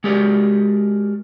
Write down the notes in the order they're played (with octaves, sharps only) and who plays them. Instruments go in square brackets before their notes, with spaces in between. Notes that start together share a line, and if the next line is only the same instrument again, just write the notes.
[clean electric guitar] G#3 F#4 G4 A#4 D5